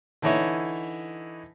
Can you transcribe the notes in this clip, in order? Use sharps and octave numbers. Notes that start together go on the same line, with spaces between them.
D3 E3 D#4 E4 C#5